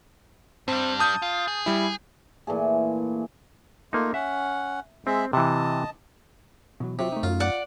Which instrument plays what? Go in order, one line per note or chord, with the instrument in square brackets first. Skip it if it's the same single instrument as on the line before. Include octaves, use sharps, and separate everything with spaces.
[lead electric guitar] G2 G3 [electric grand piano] C4
[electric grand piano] A5 D#6 G6
[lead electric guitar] F4
G#4
[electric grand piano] G3 E4
[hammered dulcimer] A#2 E3 A3 G#4
[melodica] A3 F4 [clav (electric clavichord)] A#3 D#4
[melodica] C#4 F#5 [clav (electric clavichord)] E5
[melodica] G#3 G#4 E5 [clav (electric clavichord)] C4
[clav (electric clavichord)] C3 E3 [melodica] D#5 A5
[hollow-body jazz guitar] B2 E3 F#3
[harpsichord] C3 [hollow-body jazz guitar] F#3 F4
[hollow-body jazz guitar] A3 D#4
[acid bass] F#2 [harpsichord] F4
[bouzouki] D5 F#5